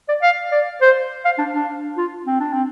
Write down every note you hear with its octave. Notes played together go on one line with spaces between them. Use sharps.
D5
F5
D5
C5
F5
D4
D4
F4
C4
D4
C4